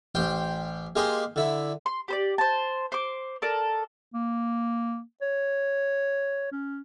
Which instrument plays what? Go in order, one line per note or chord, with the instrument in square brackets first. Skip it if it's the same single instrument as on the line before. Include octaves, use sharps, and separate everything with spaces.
[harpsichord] A1 C5 G5 C6
G#3 A#3 G4 D#5 C6
D3 E4
[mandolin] C6
G4 C5 D5
C5 A5
C5 D6
A4 A#4 D5
[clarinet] A#3
C#5
C#4